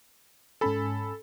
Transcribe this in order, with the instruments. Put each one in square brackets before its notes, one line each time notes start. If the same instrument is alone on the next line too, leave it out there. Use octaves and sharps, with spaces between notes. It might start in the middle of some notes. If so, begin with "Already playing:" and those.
[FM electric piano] G#2 C#4 G#5 [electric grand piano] A4 B5